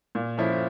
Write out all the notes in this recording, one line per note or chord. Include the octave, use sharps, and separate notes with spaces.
A#2
F3 C#4 E4